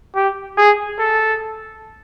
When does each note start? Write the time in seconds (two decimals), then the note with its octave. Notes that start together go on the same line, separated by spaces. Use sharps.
0.16 G4
0.58 G#4
0.99 A4